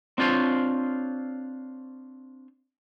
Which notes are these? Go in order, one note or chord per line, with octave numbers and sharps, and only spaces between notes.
C4 D4 F4 C5 C#5